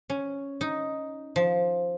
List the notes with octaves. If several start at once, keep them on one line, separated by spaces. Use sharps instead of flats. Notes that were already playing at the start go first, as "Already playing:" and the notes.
C#4
D#4
F3